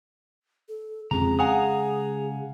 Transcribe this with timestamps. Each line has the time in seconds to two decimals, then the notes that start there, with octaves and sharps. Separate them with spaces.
0.69 A4
1.11 F2 C#3 G#3 C#4 G#4 A#5
1.39 F5 F#5 G#5 A#5 D#6